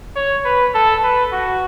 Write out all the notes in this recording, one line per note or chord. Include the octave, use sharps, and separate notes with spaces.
C#5
B4
A4
B4
F#4